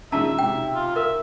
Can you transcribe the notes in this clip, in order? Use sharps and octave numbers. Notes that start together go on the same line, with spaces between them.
A#1 D#3 G#3 C#4 E5 A5
B1 G#2 C3 G5
F4
A#4 E5